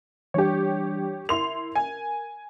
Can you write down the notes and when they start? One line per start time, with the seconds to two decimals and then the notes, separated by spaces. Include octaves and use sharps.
0.34 E3 G3 D4 G4 C#5
1.29 E4 A#4 C6 F7
1.75 G#5